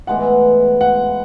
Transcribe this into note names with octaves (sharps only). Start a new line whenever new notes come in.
A2 E3 G#3 B3 F#5
F#5